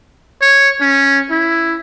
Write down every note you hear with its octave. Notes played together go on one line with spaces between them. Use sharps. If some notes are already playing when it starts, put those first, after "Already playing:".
C#5
C#4
E4